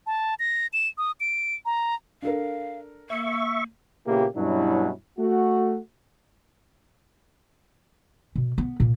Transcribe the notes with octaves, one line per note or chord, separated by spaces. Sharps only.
A5
A#6
E7
D#6
D7
A#5
D4 A4 A#4 F5
A#3 E5 C#6
A#2 C#3 A#3 B3 E4 G4
G2 B2 F#3 C#4 D4 E4
A3 F#4
B2
B3
A#2